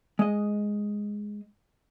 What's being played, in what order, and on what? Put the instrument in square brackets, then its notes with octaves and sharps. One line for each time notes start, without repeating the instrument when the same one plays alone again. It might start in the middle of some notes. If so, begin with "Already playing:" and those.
[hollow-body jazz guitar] G#3 D#5